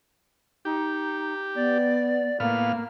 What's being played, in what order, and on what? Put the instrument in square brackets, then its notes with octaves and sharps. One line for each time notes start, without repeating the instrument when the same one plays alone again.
[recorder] D#4 [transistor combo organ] G4
[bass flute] B3 [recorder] D5
[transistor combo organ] A2 B3 F6 [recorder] A#3 [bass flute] F5